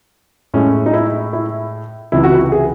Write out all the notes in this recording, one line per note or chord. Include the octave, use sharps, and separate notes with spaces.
A2 G#3 C#4
D#4
E4
E4
C#2 C3 E3 E4
F#4
E4
G#4